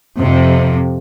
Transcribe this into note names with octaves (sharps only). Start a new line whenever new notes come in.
F2 C3